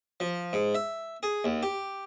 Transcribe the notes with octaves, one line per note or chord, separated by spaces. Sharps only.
F3
G#2
E5
G#4
D#2
G4